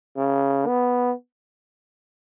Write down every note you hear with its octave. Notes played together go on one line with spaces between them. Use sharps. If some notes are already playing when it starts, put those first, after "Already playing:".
C#3
B3